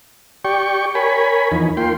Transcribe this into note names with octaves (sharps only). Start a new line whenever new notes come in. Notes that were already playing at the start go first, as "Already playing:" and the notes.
G4 D5 G5 C#6
A#4 C#5 G#5 B5
E2 F3 D#4
A#3 F4 G5 C6